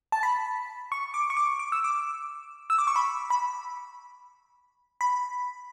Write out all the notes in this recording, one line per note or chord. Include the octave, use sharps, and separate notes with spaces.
A5
B5
C#6
D6
C#6
D6
D6
E6
D6
E6
D6
C#6
B5
B5
B5